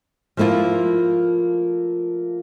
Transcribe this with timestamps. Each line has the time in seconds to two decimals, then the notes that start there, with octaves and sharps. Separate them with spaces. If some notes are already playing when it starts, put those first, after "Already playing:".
0.37 F3 A3 A#3 E4 F4